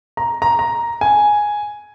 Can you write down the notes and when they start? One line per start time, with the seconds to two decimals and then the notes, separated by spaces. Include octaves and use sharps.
0.17 A#5
0.42 A#5
0.59 A#5
1.01 G#5